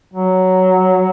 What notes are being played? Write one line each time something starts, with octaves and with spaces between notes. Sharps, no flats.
F#3